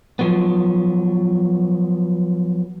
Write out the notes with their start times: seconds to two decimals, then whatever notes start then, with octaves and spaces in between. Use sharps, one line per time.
0.19 F3 F#3 B3